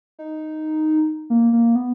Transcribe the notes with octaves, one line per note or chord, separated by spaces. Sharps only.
D#4
A#3
A#3
B3